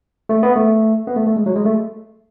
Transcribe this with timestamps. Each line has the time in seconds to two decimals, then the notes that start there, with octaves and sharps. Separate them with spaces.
0.29 A3
0.43 B3
0.56 A3
1.07 B3
1.16 A3
1.27 A3
1.36 G#3
1.46 F#3
1.56 G#3
1.65 A3